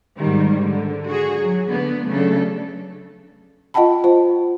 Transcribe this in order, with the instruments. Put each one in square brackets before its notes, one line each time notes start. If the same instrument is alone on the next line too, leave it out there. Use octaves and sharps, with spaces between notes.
[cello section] G#2 D#3 G3
D3
F#4 G#4
F#3
D3 B3
C#3 F#3 A3 D4 A4
[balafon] F4 D#5 F#5 G5 A5 B5
F4 C5